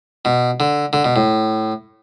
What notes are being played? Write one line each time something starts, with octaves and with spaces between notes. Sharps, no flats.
B2
D3
D3
B2
A2